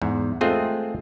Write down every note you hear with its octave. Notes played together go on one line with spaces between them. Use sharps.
E2 G#2
G#3 A3 C4 F4 G#4